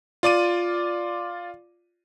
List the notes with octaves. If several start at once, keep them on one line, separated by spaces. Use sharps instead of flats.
F4 D5 D6 D#7